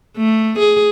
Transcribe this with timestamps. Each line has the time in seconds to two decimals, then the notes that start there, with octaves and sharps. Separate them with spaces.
0.16 A3
0.58 G#4